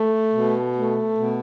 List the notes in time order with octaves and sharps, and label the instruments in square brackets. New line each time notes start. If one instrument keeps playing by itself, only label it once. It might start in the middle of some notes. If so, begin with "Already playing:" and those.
Already playing: [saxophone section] A3
B2
A3
B2